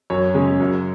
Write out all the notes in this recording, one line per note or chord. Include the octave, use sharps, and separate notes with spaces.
F#2 C#5
C#3 G#3 C#4
F#2